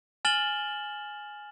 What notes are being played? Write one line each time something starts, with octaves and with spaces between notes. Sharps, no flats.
G#5 F6 A6 E7 F#7 G7